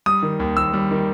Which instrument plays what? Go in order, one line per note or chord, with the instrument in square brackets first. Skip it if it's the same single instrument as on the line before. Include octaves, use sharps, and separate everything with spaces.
[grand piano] G3 D#6
D#3
D#2
D#2 E6
G3
D#3